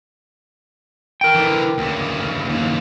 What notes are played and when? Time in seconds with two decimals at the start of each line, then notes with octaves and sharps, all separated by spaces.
1.21 A#4 G5
1.35 D3 E3
1.78 D2 C#3
2.49 D#2 C#3